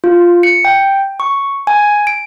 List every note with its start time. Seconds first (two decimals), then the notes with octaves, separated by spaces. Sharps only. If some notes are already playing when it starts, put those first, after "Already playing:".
0.04 F4
0.43 C#7
0.65 G5
1.20 C#6
1.67 G#5
2.07 D7